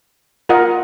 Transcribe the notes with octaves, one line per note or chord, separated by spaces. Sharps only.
F4 A#4 D#5 F#5